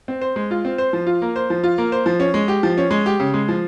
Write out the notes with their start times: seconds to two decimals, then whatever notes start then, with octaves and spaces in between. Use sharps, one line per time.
0.08 C4
0.21 C5
0.36 G#3
0.51 F4
0.65 C4
0.78 C5
0.93 F3
1.06 F4
1.22 A#3
1.36 C5
1.50 F3
1.63 F4
1.78 A#3
1.92 C5
2.06 F3
2.20 C#4
2.34 G#3
2.48 G4
2.63 F3
2.78 C#4
2.91 G#3
3.06 G4
3.20 C#3
3.34 G#3
3.48 F3